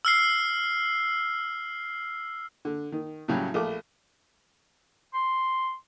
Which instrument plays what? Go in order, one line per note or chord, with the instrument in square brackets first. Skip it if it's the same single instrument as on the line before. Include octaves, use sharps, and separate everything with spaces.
[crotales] E6 F6 C7
[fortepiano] D3
D#3
A2 C#3 F#3 G3
A#1 A3 D6
[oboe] C6